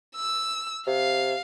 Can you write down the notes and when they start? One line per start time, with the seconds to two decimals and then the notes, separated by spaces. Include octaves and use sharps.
0.16 E6
0.87 C3 F5